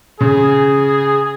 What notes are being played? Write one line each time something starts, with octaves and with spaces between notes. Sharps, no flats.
C#3 G#4